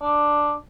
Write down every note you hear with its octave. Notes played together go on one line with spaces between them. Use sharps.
D4